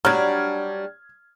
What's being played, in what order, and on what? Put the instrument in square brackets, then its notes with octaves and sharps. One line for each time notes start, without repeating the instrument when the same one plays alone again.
[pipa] F#3 [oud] G3 D4 [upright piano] F6 G#6